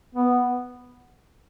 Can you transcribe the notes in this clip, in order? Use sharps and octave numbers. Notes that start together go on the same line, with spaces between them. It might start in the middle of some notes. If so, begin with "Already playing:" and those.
B3